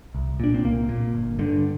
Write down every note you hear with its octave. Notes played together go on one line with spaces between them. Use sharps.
C2
A#2 D4
C4
C2 A#3
A#2
G1
G2 D3